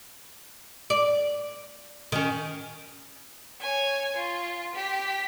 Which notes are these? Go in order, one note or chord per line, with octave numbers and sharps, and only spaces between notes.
D5
D#3 C#4
C#5 G#5
F4
G4 B6